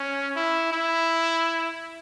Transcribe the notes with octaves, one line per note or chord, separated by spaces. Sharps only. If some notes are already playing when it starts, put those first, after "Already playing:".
Already playing: C#4
E4
E4